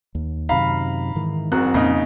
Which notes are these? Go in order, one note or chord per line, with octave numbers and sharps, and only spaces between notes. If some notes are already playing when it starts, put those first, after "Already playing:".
D#2
F#2 C3 D#3 F5 A#5 B5
G#2 D#3 E3
F#1 C4 F#4 A#4 A#5 F#6
F2 A#2 C#3 A#3 D#4